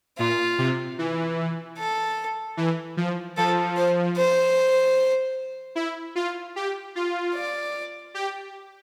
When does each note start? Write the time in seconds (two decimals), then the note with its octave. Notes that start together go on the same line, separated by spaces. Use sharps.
0.18 A#2 F4
0.58 C3
0.98 E3
1.78 A4
2.57 E3
2.97 F3
3.37 F3 A4
3.77 C5
4.17 C5
5.75 E4
6.15 F4
6.56 G4
6.96 F4
7.35 D5
8.14 G4